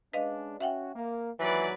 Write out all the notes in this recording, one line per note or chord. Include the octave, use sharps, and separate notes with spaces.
G#3 C#4 D4 B4 D#5 F5
C#4 F#4 E5 F#5 G5
A#3
D#2 G#2 E3 F#3 B4 D5